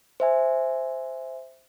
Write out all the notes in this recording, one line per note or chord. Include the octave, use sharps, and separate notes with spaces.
C5 E5 G#5